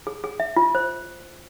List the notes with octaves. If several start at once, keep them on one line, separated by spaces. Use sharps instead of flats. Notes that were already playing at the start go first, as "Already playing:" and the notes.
G#4
G#4
E5
F4
C5